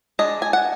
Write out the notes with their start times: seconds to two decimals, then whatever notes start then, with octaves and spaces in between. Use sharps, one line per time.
0.19 G#3 D4 D#5
0.42 G#5
0.53 F#5